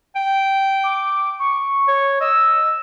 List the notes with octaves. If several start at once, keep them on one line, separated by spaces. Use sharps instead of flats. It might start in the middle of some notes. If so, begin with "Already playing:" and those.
G5
D6
C#6
C#5
D#5 E6